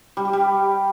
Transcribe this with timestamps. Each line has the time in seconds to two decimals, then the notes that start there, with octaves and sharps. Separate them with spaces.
0.17 G3
0.25 G4
0.33 G3